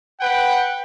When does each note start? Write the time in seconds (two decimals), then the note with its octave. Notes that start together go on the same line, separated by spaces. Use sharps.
0.21 B4 F#5 G5